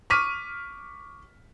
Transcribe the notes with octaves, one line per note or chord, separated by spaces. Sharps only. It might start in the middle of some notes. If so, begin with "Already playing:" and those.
C#6 D6 F6 B6 D#7